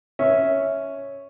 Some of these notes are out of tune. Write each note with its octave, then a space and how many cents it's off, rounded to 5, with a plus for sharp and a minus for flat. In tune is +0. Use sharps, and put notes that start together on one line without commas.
C#4 +0 E5 -10